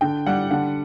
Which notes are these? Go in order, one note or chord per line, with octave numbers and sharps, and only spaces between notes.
D3 G5
G3 F#5
D3 F#5